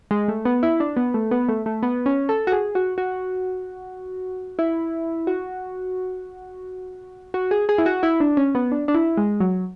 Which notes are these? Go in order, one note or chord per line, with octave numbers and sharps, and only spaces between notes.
G#3
A3
B3
E4
D4
B3
A3
B3
A3
A3
B3
C#4
A4
F#4
G#4
F#4
F#4
E4
F#4
F#4
G#4
G#4
E4
F#4
E4
D4
C#4
B3
D4
D4
E4
G#3
F#3